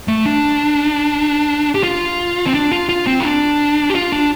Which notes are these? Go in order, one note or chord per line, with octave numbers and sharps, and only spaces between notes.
A3
D4
G4
F4
C4
D4
F4
F4
C4
F4
D4
G4
F4
D4